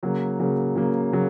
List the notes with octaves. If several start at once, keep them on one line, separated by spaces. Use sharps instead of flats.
C#3 F#3 A#3
C#3 F#3 A#3
C#3 F#3 A#3
C#3 F#3 A#3